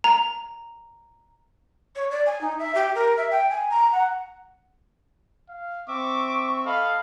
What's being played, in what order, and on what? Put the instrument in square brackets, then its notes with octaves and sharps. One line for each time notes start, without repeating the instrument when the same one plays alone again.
[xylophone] A#5
[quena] C#5
D5
G#5
D#4
E5
G4
A#4
E5
G5
G#5
A#5
F#5
[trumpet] F5
[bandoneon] C4 E5 [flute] C#6 [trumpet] D6
[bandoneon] A4 D#5 [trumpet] F5 [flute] B5